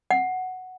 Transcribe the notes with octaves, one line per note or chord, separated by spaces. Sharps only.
F#5